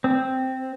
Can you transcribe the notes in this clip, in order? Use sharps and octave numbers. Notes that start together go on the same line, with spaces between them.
C4